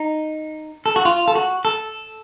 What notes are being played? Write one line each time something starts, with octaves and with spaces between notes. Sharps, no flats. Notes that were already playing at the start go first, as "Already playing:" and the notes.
Already playing: D#4
A4
F#4
F4
A4
F#4
A4